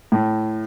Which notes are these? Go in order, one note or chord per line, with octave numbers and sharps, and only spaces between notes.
A2